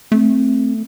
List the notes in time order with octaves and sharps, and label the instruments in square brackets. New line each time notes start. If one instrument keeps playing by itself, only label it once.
[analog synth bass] A3 [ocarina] C4